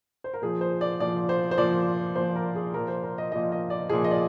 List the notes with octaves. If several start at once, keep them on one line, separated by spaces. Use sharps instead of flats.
C5
A#4
A#2 F3 G#4
C5
D5
A#2 F3 D5
C5
C5
A#2 F3 D5
A#2 F3 C5
A#4
G#4
A#2 F3 A#4
C5
A#4
D#5
A#2 F3 D#5
D#5
D5
A#2 F3 G#4
D#5
D5